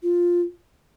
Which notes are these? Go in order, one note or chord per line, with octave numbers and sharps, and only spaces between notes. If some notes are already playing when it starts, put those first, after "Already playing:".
F4